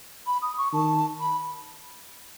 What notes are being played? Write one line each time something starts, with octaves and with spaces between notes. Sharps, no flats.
B5
D#6
C#6
D#3 A5
B5